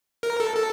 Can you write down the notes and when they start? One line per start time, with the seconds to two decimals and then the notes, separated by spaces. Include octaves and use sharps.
0.23 A#4
0.40 A4
0.56 A4